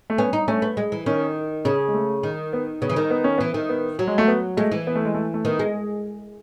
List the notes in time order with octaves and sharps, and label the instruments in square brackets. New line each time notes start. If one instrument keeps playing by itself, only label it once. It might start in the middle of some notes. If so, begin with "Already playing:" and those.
[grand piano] A3
[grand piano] B3 [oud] C#4
[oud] D#4
[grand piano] A3 [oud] C#4
[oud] B3
G#3
E3
[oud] D#3 [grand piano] C#4
[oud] C#3 [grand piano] C#4
[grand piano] G#3
A3
[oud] D#3
[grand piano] B3
[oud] C#3 [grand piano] B3
[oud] E3
D#3
[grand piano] B3
C#4
[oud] E3 [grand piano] B3
[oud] D#3
[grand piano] B3
[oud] F#3
[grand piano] G#3
A3
B3
[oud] G#3 [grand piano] A3
[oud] E3
[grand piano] B3
A3
G#3
A3
A3
[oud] D#3 [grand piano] B3
[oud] G#3